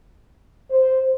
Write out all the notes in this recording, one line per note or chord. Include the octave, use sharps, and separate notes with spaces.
C5